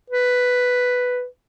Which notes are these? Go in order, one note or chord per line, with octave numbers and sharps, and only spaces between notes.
B4